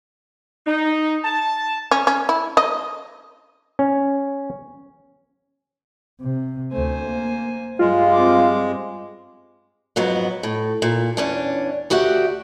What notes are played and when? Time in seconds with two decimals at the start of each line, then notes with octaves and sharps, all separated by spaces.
0.66 D#4
1.24 A5
1.91 C#4
2.07 C#4
2.29 E4
2.57 D#5
3.79 C#4
6.21 C3
6.72 D2 A3 C5 G#5
7.04 A#3
7.79 G2 G3 G#3 F4
8.12 C4 D6
9.96 F2 G#2 F#3 B3
10.43 A2
10.82 A#2
11.17 E2 C#4 D4
11.90 D2 F#4 G4 E5 F#5